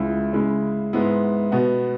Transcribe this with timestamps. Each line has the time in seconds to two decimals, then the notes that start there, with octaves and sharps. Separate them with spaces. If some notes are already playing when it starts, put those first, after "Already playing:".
Already playing: C#2 C#3 G#3 E4
0.33 C#3 G#3 E4
0.93 G#2 G#3 B3 E4
1.52 B2 B3 F#4